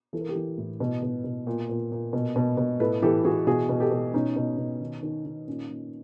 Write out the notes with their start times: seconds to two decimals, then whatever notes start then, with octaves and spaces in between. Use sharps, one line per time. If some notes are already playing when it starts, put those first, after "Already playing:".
0.13 E3 A4
0.21 A#4
0.29 G4 A4
0.35 E3
0.58 A2
0.80 B2
1.03 B2
1.24 B2
1.47 A#2
1.69 A#2
1.92 A#2
2.13 B2
2.36 B2
2.57 B2
2.80 A2 A4 B4
3.02 E3 G4 A4
3.24 E3 F#4 G#4
3.47 B2 F#4 G#4
3.69 B2
3.80 G4 A4
3.91 B2
4.14 B2 C#4 D#4
4.36 B2
4.58 B2
4.81 D#3
5.03 D#3
5.25 D#3
5.48 A#2 C#4
5.69 A#2